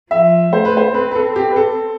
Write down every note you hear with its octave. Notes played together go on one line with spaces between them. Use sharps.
F3 E5
A3 C5
B4
C5
C4 B4
B4
A4
G4
B4
A4